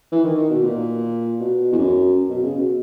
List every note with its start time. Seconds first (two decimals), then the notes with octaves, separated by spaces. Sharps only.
0.12 E3
0.24 D#3
0.37 D#3
0.50 B2
0.63 A#2
1.40 B2
1.72 E2
1.78 F#2
2.30 B2
2.43 C#3
2.56 B2